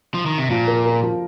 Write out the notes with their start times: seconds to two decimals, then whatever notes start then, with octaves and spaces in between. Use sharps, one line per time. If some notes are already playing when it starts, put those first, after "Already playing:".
0.14 F3
0.26 D#3
0.38 C3
0.50 A#2 F3
0.67 A#4
0.85 A#4
1.02 F3